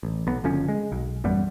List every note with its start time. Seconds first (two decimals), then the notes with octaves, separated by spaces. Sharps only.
0.03 A1
0.27 B1 B3
0.44 F#1 D3 F3 C#4
0.68 G#3
0.92 B1
1.24 A1 F#2 G3 B3